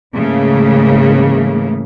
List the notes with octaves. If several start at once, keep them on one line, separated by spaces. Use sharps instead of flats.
G#2 C#3 E3 A3 A#3